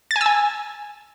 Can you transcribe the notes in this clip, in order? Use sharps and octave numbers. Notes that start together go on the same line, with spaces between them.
A6
G#5
E6
G#5